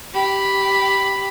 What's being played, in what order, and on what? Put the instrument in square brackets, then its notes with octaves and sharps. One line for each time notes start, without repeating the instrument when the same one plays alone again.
[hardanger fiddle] G4 B5